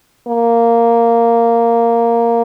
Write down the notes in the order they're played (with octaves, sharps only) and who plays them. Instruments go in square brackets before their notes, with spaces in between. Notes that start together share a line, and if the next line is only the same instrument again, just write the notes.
[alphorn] A#3